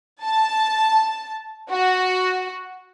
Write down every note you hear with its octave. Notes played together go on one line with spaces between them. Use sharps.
A5
F#4